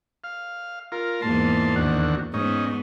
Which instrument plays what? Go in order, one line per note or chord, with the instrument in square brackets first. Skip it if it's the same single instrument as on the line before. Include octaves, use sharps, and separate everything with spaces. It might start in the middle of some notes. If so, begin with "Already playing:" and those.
[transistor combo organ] F5
F4 A#4
[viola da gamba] E2 G#2 A#3 [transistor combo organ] A5 C6
[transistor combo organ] D#2 D3 F#4
[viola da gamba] G#2 B3 [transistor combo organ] C#4 D#4